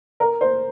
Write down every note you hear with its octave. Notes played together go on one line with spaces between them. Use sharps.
A#4
C5